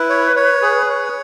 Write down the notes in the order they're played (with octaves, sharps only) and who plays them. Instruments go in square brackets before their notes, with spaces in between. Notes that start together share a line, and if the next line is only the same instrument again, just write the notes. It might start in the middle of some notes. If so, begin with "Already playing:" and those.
Already playing: [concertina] E4 [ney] B4
[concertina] C#5
C#5
G#4
C#5